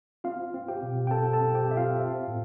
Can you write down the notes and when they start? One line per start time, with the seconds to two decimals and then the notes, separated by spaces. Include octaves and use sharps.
0.24 C4 F4 F5
0.54 C4
0.68 G4 G5
0.82 B2
1.07 G5
1.11 C4 A4 A5
1.33 A4 A5
1.41 C4
1.55 G4 G5
1.69 C4 E5
1.76 F4 F5
1.99 C4
2.28 A2